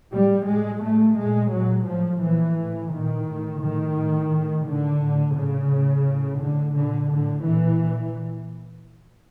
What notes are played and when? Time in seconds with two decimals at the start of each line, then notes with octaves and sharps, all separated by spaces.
0.12 A2 G3
0.47 A2 G#3
0.82 A2 A3
1.17 A#2 G#3
1.52 A#2 F#3
1.86 A2 F3
2.21 A#2 E3
2.56 A2
2.91 A#2 D#3
3.27 A2
3.61 A2 D#3
3.96 A2
4.31 A2
4.66 A2 D3
5.01 A2
5.36 A2 C#3
5.71 A2
6.05 A2
6.40 A2 D3
6.75 A#2 D3
7.10 A2 D3
7.45 A#2 E3
7.80 A#2